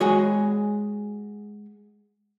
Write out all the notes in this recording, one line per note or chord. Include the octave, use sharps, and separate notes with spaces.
G#3 F#4 G#4 C#5